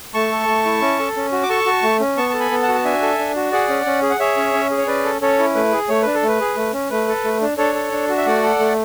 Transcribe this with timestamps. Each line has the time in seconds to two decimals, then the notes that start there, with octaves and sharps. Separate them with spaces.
0.14 A3 A5 C#6
0.32 A4
0.48 A3
0.65 E4
0.81 C#4
0.99 A4
1.16 C#4
1.32 F#4
1.43 D6
1.50 A4 A5 C#6
1.66 F#4
1.83 A3
2.00 C#4
2.17 B3 A5 C#6
2.29 A4 A5
2.40 G#5 B5
2.51 B3
2.62 F#5 A5
2.68 F#4
2.74 A5
2.84 D4 E5 G#5
3.02 A4
3.19 D4
3.36 F#4
3.52 G#4 D5 F#5
3.69 C#4
3.86 C#4
4.03 G#4
4.10 F#5
4.20 G#4 C#5 E5
4.37 C#4
4.54 C#4
4.71 G#4
4.78 C#5
4.87 C#4 B4 D5
5.05 A4
5.21 C#4 A4 C#5
5.39 E4
5.55 A3 B4
5.72 G#4
5.89 A3 C#5
6.02 D4 B4
6.14 A4
6.23 A3 B4
6.40 G#4
6.56 A3
6.73 C#4
6.90 A3 B4
7.08 A4
7.25 A3
7.41 D4
7.58 D4 A4 C#5
7.75 A4
7.92 D4
8.09 F#4
8.17 E5
8.26 A3 D5 F#5
8.43 A4
8.60 A3